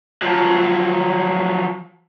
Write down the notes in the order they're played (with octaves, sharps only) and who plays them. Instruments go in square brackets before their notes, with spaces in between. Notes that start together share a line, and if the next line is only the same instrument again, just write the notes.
[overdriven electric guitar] F3 F#3